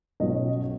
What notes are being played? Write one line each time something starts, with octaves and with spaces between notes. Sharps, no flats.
B1 B2 F#3 C#4 D#5